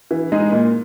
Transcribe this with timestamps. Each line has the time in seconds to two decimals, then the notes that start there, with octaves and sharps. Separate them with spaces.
0.11 E3
0.32 G#3 D#4 G#4
0.52 A#2